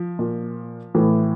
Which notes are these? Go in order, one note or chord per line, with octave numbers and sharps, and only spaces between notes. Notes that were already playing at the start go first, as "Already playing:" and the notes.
Already playing: F3
A#2
A2 E3